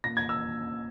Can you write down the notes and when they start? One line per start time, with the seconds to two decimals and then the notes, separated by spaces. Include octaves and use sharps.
0.04 A#2 A#6
0.17 G#6
0.29 E6